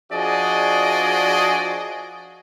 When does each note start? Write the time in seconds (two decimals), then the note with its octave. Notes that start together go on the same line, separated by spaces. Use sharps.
0.13 F3 D4 F#4 G#4 D5 D#5